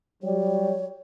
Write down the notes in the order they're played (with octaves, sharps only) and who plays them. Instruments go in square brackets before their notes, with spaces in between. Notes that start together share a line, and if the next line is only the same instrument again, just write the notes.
[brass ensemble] F#3 G3 [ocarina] C#5